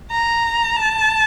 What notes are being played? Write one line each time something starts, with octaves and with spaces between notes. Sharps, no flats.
A#5
A5